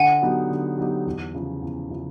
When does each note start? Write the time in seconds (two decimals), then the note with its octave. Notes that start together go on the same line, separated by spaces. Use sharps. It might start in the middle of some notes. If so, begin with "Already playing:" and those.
Already playing: D3 F#5 G#5
0.22 F#3 B3 D#4 G4
0.50 D3
0.78 F#3 B3 D#4 G4
1.06 E2
1.35 C#3 F3
1.62 E2
1.91 C#3 F3